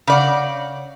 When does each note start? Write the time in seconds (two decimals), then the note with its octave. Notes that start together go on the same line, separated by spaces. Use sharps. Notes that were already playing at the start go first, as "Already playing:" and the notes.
0.07 C#3 D5 F#5